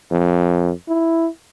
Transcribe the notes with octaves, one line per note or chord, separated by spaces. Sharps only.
F2
E4